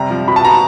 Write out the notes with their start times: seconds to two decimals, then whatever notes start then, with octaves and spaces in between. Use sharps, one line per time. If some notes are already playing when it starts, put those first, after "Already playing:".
Already playing: C3 G3 A#5
0.10 F3
0.28 B2 B5
0.36 A5
0.45 B2 A#5